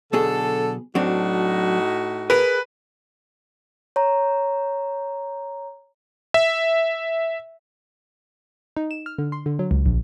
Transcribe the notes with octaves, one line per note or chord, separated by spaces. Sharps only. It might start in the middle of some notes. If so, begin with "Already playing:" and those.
B1 B2 D3 G#4 A4
A2 F#3 C4 D4 D#4 F#4
G#4 A#4 B4
C#5 A#5
E5
D#4
E7
F6
D3
C6
D3
F#3
C#2
A#1